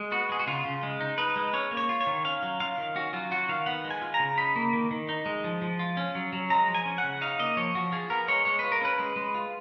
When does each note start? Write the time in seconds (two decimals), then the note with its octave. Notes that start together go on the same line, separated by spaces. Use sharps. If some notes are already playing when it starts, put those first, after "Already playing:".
Already playing: G#3
0.12 B3 F#4
0.30 G#3 G#4
0.39 F#4
0.47 C#3 F4
0.65 C#3
0.83 G#3
1.00 D#4
1.18 D#4 B4
1.36 G#3
1.53 C#4 C#5
1.71 A#3
1.77 C#5
1.89 F4
2.01 C#5
2.07 D#3
2.25 C#4 F5
2.42 F#3
2.60 F4 F5
2.78 D#3
2.96 C#4 F#4
3.13 F#3 F4
3.31 F4 F#4
3.49 D#3 F5
3.66 B3 F#5
3.84 G#3
3.91 G#5
4.02 F4
4.14 A#5
4.19 C#3
4.38 D#4 B5
4.56 A#3
4.73 D#3
4.91 D#3
5.09 D#4
5.26 G#3
5.44 F3
5.62 F3
5.79 F4
5.97 C#4
6.15 F#3
6.33 F#3
6.50 G#3 A#5
6.68 F3
6.75 G#5
6.85 C#4
6.98 F#5
7.04 C#3
7.21 D#4 F5
7.39 A#3 D#5
7.57 F3 C#5
7.75 F3 F#4
7.92 F4 G#4
8.10 B3 A#4
8.28 G#3 C#5
8.45 G#3 C#5
8.59 F4 B4
8.72 A#4
8.81 C#4 B4
8.99 G#3
9.16 G#3
9.34 F4